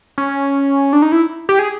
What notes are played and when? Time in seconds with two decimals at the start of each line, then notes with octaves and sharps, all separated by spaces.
0.18 C#4
0.93 D4
1.02 D#4
1.12 E4
1.49 G4
1.59 G#4